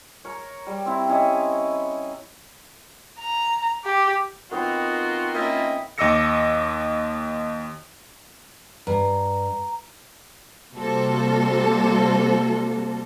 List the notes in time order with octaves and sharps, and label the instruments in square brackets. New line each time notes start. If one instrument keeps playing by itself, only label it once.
[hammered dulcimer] A#4 C#5
G3
C4 E4
C#4 E4 C#5 D#5
[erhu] A#5
G4
[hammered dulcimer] D#3 B3 C4 [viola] F4 A#4 [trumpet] F#4
[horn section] A#3 C#4 E4 [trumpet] D#5
[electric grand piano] D#2 D#5 D6 E6 A#6 C#7
[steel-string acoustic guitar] G2 [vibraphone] A#5
[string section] C3 G3 A#3 F#4 A4 C5